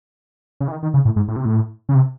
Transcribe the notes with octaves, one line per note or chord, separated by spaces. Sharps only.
C#3
E3
D#3
D#3
C#3
A2
G#2
A2
C3
A2
C#3
C3